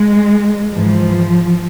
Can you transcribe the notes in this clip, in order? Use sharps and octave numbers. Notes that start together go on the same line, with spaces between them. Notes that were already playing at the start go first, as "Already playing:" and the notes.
Already playing: G#3
G#2 E3 F3